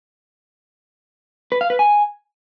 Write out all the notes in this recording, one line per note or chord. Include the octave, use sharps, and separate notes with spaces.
B4
F5
B4
G#5